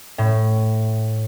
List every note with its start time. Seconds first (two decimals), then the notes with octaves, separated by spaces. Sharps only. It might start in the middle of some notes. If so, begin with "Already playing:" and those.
0.18 A2